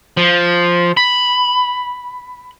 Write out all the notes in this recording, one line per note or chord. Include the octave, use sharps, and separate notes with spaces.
F3
B5